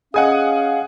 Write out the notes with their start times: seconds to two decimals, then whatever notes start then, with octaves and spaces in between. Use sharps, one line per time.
0.14 C#4 G#4 D#5 F5 F#5 G#5 D#6